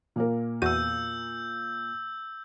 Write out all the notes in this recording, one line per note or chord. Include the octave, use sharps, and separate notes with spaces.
A#2 A#3 A#4
E2 F#4 E6 G6 D#7